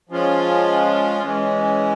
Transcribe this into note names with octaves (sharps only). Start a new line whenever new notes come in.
F3 G#3 C#4 F4
E3 G#3 C#4